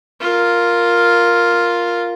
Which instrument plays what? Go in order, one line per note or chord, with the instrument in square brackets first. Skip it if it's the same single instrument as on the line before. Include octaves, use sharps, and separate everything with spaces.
[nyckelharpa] F4 A#4